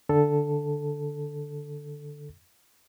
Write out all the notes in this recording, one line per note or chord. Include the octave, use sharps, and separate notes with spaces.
D3 A4